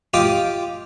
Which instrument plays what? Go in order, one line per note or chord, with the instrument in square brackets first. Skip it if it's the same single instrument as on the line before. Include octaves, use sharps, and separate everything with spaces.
[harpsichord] F4 G4 D#5 D6